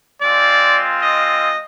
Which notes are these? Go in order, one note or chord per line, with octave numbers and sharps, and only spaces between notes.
G#3 C4 F4 D5
D#5